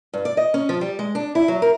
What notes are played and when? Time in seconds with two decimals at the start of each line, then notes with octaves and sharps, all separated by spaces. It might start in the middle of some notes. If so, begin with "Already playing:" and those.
0.14 G2
0.25 D5
0.37 D#5
0.54 C#4
0.69 F3
0.81 G3
0.99 G#3
1.15 D4
1.35 E4
1.48 F#3
1.62 A#4